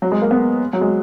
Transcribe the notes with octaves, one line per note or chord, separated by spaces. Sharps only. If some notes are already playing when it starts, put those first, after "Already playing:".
F#3
G#3
A#3
B3
F#3
G#3